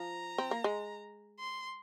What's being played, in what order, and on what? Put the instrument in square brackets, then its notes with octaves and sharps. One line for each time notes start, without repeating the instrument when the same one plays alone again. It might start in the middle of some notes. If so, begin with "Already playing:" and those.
Already playing: [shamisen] F3 [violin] A#5
[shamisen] C4
A#3
G#3
[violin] C6